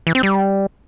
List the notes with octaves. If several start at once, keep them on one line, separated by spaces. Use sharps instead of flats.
E3
C4
G3